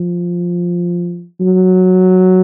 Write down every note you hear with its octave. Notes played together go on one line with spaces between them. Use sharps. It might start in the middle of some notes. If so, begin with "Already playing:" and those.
Already playing: F3
F#3